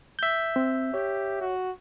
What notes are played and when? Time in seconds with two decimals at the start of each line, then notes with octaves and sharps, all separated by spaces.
0.19 E5 G6
0.56 C4
0.94 G4 C#5
1.41 F#4